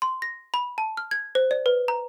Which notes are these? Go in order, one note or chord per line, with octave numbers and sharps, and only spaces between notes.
C6
A#6
B5
A5
F6
G#6
C5
D5
B4
A#5